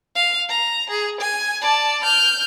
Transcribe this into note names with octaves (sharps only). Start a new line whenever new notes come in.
F5
A#5
G#4
G#5
D5 A5
F6 G6